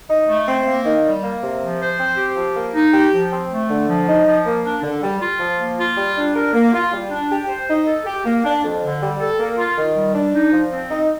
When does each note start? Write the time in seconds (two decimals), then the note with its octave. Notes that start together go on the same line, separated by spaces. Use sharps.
0.09 D#4
0.28 A3
0.48 C4
0.66 A#3
0.85 D#3
1.05 G3
1.22 A#3
1.42 C3
1.61 F3
1.81 C5
1.99 C4
2.17 G4
2.37 F3
2.55 A#3
2.75 D#4
2.93 G4
3.13 F3
3.32 C4
3.50 A3
3.69 D3
3.89 F3
4.08 D#4
4.26 F3
4.46 A#3
4.64 D4
4.83 D3
5.03 G3
5.22 F4
5.40 F3
5.60 A#3
5.79 F4
5.97 G3
6.16 D4
6.35 A#4
6.54 A#3
6.73 F4
6.93 G3
7.11 D4
7.31 G4
7.49 C5
7.69 D#4
7.87 A4
8.06 G4
8.25 A#3
8.45 D4
8.64 F2
8.83 D3
9.01 G3
9.20 A4
9.39 A#3
9.57 F4
9.77 D#3
9.96 G3
10.14 D4
10.34 D#4
10.53 F3
10.72 C4
10.90 D#4